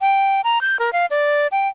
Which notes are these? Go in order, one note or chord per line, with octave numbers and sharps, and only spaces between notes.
G5
A#5
G6
A#4
F5
D5
G5